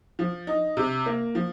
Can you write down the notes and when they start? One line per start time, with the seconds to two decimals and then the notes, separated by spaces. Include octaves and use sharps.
0.19 F3
0.47 D#4
0.77 C3
1.06 A#3
1.35 F3